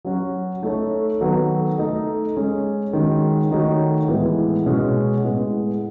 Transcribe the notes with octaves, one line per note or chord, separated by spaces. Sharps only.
F#3 C#4 F#4
A3 D#4 A4 C#5
D#3 F#3 B3 F#4 A4
A3 D#4 A4 D#5
G#3 C#4 G#4
D#3 G#3 C#4 F#4
D#3 A3 D#4 F#4 C#5
A2 E3 G#3 B3
B2 G#3 C#4 F#4
A2 G#3 B3